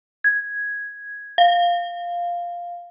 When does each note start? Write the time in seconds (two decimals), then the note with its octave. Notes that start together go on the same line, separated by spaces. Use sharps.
0.24 G#6
1.38 F5